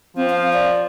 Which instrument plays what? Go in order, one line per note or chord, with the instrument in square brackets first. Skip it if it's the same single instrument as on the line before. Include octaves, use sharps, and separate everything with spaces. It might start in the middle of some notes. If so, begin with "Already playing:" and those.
[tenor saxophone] F3 [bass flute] C4
[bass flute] F5
D5